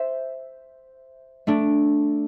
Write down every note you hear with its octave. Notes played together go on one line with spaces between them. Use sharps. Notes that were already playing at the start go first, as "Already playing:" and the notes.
Already playing: C5 E5
A3 D4